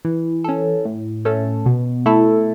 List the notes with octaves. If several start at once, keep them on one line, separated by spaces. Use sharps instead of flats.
E3
C#4 A4
A2
A3 C#4 A4
B2
A3 E4 A4